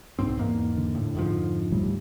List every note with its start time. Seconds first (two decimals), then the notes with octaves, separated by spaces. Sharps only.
0.19 B1 G#2 C4
0.38 E2 G#2 A#3
0.77 D3
0.95 A2
1.15 F2 G#2 F3
1.71 D2 A2 G3